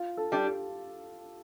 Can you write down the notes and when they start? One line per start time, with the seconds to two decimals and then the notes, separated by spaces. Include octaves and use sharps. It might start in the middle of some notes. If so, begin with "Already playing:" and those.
Already playing: F4
0.17 A4
0.32 G3 D4
0.45 G4